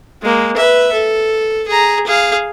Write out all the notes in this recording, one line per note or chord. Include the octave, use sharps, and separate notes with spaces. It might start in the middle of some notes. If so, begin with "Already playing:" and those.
G#3 A#3
B4 E5
A4
G#4 A#5
G#4 F5